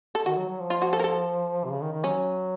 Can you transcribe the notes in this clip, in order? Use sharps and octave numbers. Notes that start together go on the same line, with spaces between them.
A4
D#3 F#4
F#3
F#3
F3
F4
F#4
A4
A#4
A4
C3
C#3
D#3
D#3
F#3 C#4